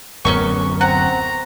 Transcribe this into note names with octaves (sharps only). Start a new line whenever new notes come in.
D1 F#2 B3 C#4 E4 A#4 C#6
C4 F#5 A#5